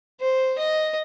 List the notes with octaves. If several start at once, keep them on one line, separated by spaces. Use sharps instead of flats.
C5
D#5